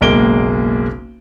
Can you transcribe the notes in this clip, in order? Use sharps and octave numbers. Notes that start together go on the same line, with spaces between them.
F#1 B1 G#3 A#3 D7 G7